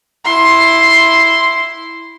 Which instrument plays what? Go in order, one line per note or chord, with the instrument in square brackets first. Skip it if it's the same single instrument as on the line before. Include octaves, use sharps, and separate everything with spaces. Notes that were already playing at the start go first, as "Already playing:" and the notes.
[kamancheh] E4 C6